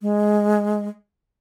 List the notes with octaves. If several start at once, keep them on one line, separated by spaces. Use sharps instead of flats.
G#3